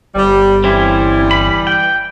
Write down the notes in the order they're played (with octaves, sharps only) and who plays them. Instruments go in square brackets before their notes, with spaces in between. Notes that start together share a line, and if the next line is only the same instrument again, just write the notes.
[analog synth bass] G1 [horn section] G3
[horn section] E3 G3 [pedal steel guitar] C4 C#4 E4
[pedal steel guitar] B5
G5